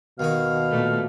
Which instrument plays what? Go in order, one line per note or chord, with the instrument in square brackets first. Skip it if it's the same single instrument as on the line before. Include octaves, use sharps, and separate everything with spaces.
[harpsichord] D#2 D#3 F#4 [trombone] B2 [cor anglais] F5
[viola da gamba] A#2 A3